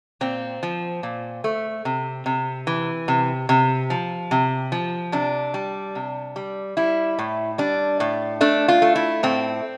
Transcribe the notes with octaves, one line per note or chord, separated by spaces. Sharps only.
A#2 C4
F3
A#2
A3
C3
C3
E3
C3
C3
F3
C3
F3
C3 D4
G3
C3
G3
G3 E4
A2
G3 D4
A2
A3 D4
F4
A3
E4
A2 C4